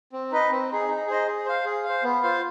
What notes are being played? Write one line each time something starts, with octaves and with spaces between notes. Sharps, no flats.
C4
D#4 B4 D#5
C4
D#4 G#4
D#4
G#4 C5 D#5
G#4
C5 F5
G#4
C5 F5
B3
F4 C5 F5